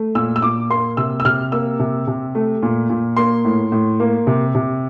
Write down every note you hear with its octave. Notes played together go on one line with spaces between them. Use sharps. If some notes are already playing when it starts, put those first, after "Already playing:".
Already playing: A3
A#2 E6
E6
A#2 D6
A#3 C6
C3 E6
E6
C3 F6
A#3 E6
C3
C3
A3
A#2
A#2
A#3 C6
A2
A2
A#3
C3
C3